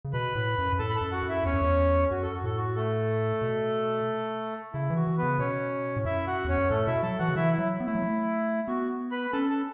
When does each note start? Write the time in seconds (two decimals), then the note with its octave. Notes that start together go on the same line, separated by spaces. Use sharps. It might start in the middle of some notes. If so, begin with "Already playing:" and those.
0.05 C#3
0.13 B2 B4 B5
0.35 A2
0.58 F#2
0.73 F#2
0.79 A2 A4 A5
0.90 B5
0.95 A4 A5
1.01 F#2
1.12 F#4 F#5
1.23 F#2
1.29 E4 E5
1.45 E2 C#4 C#5
1.53 F#2
1.61 E2
2.11 F#2 F#4
2.23 A4
2.34 F#4
2.44 A2 A4
2.57 F#4
2.76 A3 A4
3.42 B2
4.74 C#3 E4
4.90 E3
4.96 F#4
5.07 E3
5.17 B3 B4
5.23 C#3
5.39 B2 C#4 C#5
5.96 A2
6.05 F#2 E4 E5
6.26 F#4 F#5
6.45 E2 C#4 C#5
6.58 F#2
6.70 A2 A3 A4
6.87 B2 E4 E5
7.03 F#3 A4 A5
7.19 E3 F#4 F#5
7.29 C#3
7.36 E3 E4 E5
7.53 E4
7.58 F#3
7.80 B3
7.86 A3 E4
7.95 F#3
8.02 A3
8.68 B3 F#4
9.11 B4 B5
9.33 C#4 A4 A5
9.49 A4 A5